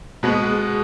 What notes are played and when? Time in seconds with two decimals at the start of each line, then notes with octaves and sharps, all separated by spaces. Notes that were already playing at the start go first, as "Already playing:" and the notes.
0.23 B2 G#3 B3